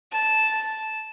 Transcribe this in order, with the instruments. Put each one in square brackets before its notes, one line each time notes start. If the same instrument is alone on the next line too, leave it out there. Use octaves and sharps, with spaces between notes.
[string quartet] A5